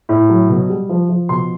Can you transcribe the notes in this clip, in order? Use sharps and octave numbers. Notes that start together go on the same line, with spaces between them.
A2
F#3
B2
G3
F3
F3
B2 C6